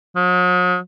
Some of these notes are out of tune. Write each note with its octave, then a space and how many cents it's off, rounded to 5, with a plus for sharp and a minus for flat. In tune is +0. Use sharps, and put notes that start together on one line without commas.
F#3 -45